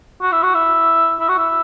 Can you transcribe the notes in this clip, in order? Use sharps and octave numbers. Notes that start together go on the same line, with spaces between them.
F#4
E4
F#4
E4
E4
F#4
E4